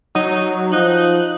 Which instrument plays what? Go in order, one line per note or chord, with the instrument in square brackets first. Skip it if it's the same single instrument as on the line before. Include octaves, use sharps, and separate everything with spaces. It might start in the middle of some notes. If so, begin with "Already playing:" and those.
[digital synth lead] F#3 [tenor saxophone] D#4
[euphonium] F3 [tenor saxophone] D#4 [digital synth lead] F#6